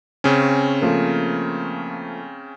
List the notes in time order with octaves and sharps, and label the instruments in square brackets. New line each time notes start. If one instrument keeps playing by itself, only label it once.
[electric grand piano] C#3 C4 C#4
[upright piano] F3 A3 A#3